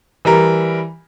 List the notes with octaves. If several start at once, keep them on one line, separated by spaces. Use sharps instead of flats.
E3 G3 A#4